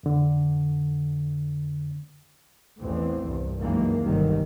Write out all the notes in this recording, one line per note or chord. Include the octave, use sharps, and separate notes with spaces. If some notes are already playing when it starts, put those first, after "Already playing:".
F2 D3
A1 E2 A2 E3 C4
C2 G2
C#2 F#2 D#3 E3 G#3 A#3
G1 C2 D#3 F#3 G3